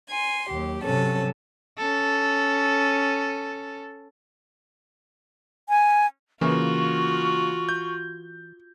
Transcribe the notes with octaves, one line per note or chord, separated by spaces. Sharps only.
G#5 C6
D#2 F#3 G4
G2 C3 F#3 C#4 A4
C#4 A4
G#5
C#3 E3 A#3 F4 F#4 C#6
G6